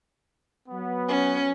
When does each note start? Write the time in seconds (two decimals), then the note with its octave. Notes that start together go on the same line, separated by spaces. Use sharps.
0.69 F#3 B3
1.08 C#4